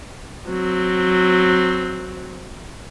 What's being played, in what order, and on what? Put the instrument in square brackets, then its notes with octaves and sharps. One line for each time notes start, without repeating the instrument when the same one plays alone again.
[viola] F#3 C4